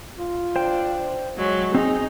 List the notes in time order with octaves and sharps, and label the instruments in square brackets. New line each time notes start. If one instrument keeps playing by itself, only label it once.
[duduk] F4
[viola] D4 [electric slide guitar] C5 G5
[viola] F#3 E5 [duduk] G#3
[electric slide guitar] C4 D#5 [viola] D#4 [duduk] G#4